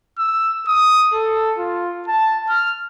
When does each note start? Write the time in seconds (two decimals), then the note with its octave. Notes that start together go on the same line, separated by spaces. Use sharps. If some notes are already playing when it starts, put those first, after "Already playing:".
0.18 E6
0.68 D#6
1.14 A4
1.59 F4
2.08 A5
2.50 F6